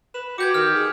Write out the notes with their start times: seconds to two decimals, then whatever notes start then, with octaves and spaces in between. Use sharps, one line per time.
0.14 B4 E7
0.38 F#4 G4 D6 G6 G#6
0.54 D#3 F6
0.75 G#4